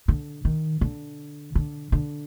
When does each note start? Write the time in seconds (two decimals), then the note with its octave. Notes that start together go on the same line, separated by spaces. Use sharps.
0.08 D3
0.45 D#3
0.81 D3
1.55 D3
1.92 D3